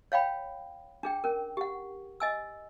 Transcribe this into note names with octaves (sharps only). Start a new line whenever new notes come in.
C#5 F5 G5 B5
D4 G#4 G5
C#4 A#4
G4 F#5
D#5 G#5 E6